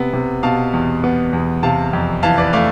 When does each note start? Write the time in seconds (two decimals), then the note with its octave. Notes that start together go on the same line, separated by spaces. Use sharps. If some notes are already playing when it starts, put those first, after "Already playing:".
Already playing: C3 B3
0.13 C3
0.43 B2 F5 A5
0.73 E2
1.04 B3
1.33 E2
1.63 C3 F5 A5
1.93 F2
2.23 E3 F5 A5
2.38 B4 D5
2.53 A3 D5 F5